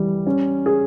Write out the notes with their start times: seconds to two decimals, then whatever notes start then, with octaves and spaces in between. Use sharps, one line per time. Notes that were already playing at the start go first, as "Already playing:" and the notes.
Already playing: E3 G3
0.27 C#4
0.66 G#4